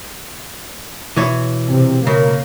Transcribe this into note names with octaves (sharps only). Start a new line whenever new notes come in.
B2 E3 C#5
C3
C#3 A#3